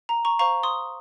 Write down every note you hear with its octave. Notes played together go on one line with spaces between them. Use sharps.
A#5
A#5 C#6
C5 F5 A#5 C#6
C6 D#6